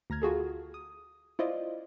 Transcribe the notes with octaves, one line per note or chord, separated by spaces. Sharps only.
D2 A#5 F6 G#6
F4 F#4 G#4 A4
D#6
E4 F4 C5 D5 D#5